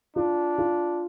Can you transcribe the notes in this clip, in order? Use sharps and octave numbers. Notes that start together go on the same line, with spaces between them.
D4 F4
F4